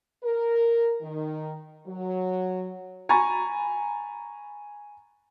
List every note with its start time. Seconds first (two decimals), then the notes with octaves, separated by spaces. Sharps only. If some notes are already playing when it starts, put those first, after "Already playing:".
0.24 A#4
1.02 D#3
1.87 F#3
3.09 G#5 A#5 B5 C#6 A6